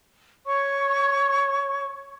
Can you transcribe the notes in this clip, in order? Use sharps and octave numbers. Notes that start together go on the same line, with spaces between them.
C#5 C#6